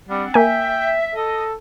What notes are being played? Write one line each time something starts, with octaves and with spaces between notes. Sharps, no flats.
G3 C4 D4 F#5
A#3 E5 G5 G#5
A4 D#5